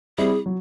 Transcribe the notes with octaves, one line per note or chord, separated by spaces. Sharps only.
G3 C4 E4 G#4
F#3